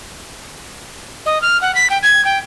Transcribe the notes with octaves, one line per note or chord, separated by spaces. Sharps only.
D#5
F6
F#5
B6
G5
G#6
G5